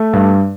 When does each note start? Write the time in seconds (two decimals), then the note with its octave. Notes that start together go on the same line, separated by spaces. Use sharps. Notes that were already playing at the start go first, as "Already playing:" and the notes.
Already playing: A3
0.13 G2